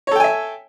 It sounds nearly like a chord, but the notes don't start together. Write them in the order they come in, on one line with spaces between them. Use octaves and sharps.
C#5 A4 G5 G#5 E5